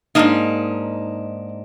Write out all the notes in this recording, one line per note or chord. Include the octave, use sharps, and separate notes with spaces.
G#2 D#3 A#3 D4 D#4 D#5